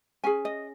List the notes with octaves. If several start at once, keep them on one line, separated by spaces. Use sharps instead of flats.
C#4 G#4 G#5
D#5